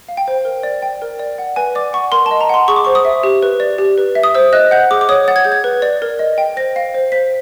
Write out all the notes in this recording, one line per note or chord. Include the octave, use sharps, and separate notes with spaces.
F5
G5
C5
A#4
D5
G5
A#4
D5
F#5
B4 G#5
D5 D6
F#5 C#6
A#4 C6
A5
D#5
A#5
F#5 C6
G#4 C#6
D6
C5 C#6
D#6
E5
G4
B4
D5
G4
B4
E5
D#6
C5 E6
D#5 F#6
F#5 G6
G#4 D6
D6
C#5 D#6
F#5 A6
G#6
G#4 G6
G#6
B4
D5
A#4
D#5
G5
C5 A#6
F5
C5
C5 B6